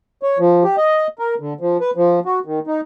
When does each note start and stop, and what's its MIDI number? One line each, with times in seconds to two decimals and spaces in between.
0.23 0.38 73
0.39 0.63 53
0.64 0.76 67
0.78 1.07 75
1.19 1.35 70
1.40 1.53 50
1.61 1.77 53
1.81 1.91 71
1.96 2.19 53
2.25 2.39 66
2.45 2.59 51
2.67 2.81 63